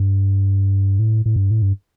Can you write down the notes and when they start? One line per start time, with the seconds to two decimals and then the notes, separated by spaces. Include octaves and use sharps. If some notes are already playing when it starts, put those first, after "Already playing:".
Already playing: G2
0.99 A2
1.26 A2
1.36 G2
1.51 A2
1.62 G2